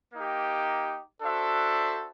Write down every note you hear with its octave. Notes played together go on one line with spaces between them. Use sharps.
A#3 D#4 G4
D4 F#4 A4 C5 E5